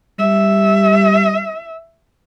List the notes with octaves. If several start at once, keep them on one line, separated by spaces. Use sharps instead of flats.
G3 E5